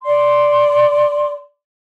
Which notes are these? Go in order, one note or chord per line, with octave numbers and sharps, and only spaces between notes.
D5 C6